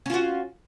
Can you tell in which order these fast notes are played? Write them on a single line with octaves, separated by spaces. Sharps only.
C#4 F4 F#4